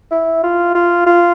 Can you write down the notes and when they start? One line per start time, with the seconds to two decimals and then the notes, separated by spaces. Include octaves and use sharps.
0.11 E4
0.43 F4
0.75 F4
1.06 F4